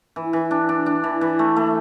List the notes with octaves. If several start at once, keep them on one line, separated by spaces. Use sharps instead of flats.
E3
E3
D4
D4
D4
E3
E3
A3
A3